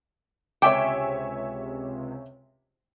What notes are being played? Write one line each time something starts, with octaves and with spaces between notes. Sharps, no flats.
C#2 C3 C#5 E5 G5 G#5 D6